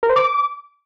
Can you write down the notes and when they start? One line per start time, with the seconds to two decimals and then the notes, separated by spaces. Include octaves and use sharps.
0.03 A#4
0.09 C5
0.16 D6